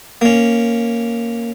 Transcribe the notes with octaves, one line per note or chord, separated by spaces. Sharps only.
A#3 C#4